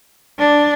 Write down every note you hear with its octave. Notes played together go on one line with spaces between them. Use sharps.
D4